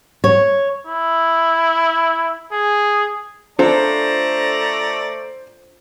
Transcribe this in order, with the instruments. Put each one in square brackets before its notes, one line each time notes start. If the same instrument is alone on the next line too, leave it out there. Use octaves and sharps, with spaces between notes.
[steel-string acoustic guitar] C#5
[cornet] E4
G#4
[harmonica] A3 D5 A#5 [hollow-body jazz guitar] D4 F4 A4 [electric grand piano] C5